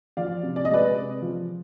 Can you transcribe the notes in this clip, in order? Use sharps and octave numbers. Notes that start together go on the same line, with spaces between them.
F3 D5 F5
C3
D5
D#5
G#3 B4 D5
C3
F3